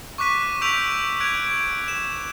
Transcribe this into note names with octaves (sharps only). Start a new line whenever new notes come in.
C#6 D6 F#6 B6 D#7
C#6 E6 G6 B6 D7 F7
F#6 G#6 D7 F7
D7
E7